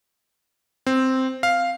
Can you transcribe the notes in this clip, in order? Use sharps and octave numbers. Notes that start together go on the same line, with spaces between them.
C4
F5